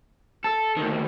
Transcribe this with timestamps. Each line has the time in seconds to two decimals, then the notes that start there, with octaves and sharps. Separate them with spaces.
0.44 A4
0.77 D2 D#3